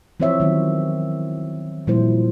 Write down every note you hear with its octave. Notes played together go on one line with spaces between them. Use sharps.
E3 F3 C4 C5 C#5 E5
D#3 F#3 B3
A#2 F3 G3 A#3 E4 C5